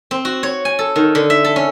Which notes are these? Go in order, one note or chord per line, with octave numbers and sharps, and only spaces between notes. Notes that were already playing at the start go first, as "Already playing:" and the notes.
C4
F#4
C#5
G#5
A4
D#3
D3
E5
A4
C#4